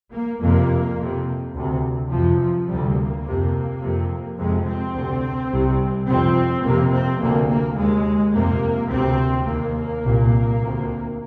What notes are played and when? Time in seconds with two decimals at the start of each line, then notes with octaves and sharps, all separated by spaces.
0.13 A#3
0.41 F2 C3 A#3
0.97 F2 C3
1.55 D2 C3
2.11 F2 C3 F3
2.40 F3
2.68 D2 C3 G3
2.97 A#3
3.25 F2 C3
3.82 F2 C3
4.38 F2 C3 G#3
4.66 C4
4.94 D2 C3
5.52 C2 C3
6.07 F2 C3 C4
6.64 F2 C3 A#3
6.92 C4
7.21 D2 C3 A#3
7.49 A#3
7.77 D#2 G#3
8.34 F2 C3 A#3
8.90 D2 C3 C4
9.47 D#2 A#3
10.04 C2 A#2
10.61 D2 C3